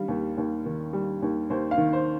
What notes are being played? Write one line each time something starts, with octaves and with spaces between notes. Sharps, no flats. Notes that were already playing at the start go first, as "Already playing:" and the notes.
Already playing: D#3 G3 F5
D#2
D#2
D#3
G3
D#2
D#2 C5
F5
D#3
C5